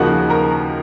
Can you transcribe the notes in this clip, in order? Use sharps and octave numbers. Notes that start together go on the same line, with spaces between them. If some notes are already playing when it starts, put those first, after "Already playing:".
Already playing: D#2 C#3 F3 A#3 D#4 F#4 F#5
A#4 A#5